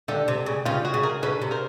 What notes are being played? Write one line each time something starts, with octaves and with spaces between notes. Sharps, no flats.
D3 G4 A4
C3
C#3
C#3 F4 G4
F#4 G#4
C#3
G#4 A#4
C#3 A4 B4
C3
A#4 C5